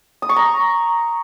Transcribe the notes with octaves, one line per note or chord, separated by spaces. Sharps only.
D#6
C#6
A#5